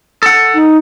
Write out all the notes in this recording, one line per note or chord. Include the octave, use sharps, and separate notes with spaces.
A4 F#5
D#4